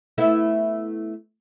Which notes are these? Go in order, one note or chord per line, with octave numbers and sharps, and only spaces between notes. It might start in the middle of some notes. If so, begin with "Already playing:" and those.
A3 B3 E4